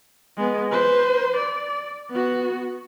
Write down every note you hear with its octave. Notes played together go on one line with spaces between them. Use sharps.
G#3 B3
B4 C5
D5
B3 F#4